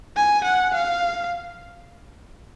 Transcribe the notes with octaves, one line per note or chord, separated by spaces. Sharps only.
G#5
F#5
F5